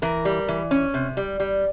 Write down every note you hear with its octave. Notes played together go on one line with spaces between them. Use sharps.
E3 A#4
G3
E3
C#4
C3
G3
G3